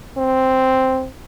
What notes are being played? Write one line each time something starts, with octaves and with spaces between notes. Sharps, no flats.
C4